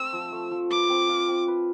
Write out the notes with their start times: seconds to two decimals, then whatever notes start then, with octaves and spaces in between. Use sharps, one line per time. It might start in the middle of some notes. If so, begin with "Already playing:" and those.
Already playing: A3 C4 E6
0.13 F3
0.32 A3
0.51 F3
0.71 B4 D6
0.90 C4
1.09 F4
1.28 C4
1.48 B4